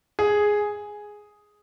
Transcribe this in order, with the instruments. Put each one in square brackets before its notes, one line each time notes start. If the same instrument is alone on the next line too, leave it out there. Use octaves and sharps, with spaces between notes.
[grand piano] G#4